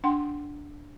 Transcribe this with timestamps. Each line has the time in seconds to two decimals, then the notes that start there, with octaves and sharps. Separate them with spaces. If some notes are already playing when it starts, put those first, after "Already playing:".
0.04 D4 F#5 G5 C6